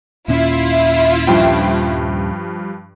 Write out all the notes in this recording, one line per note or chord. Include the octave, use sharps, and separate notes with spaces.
D#2 A#2 C#4 E4 F4
G2 F3 G5